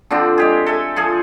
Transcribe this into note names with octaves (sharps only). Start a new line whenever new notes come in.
D3 F3 C4 D4
G#3 G4 G#4
A4 E5 G#5
F3 G#4 A4 G#5